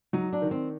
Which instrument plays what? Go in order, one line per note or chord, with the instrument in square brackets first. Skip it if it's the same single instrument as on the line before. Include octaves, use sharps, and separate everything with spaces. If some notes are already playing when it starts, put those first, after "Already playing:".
[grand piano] F#3 [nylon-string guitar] D#4
[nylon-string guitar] D4
[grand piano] D#3
[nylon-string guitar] C4